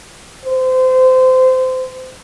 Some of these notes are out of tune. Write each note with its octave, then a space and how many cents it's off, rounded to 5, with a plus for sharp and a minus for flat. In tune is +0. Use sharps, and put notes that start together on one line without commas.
C5 -25